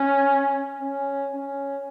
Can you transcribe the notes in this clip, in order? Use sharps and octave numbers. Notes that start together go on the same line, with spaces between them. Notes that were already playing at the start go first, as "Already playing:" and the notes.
Already playing: C#4
C#4
C#4